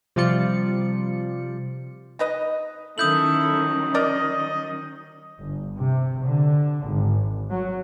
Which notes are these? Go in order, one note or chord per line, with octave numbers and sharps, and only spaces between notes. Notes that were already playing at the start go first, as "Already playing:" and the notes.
C3 F3 G3 F4 D5 C#7
D#4 B4 D#5
D#3 F#3 C#4 E4 A4 D#6 G6 F#7
A#4 D5 D#5
G1
C3
D3
G#1
F#3